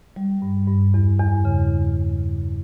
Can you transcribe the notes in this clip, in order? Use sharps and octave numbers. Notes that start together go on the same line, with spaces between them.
G3
G2
G2
E2
E2
C#3